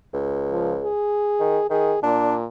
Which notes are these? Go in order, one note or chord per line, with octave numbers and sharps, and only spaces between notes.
C#2
F3
G#4
D#3
D#3 G#4
A#2 D4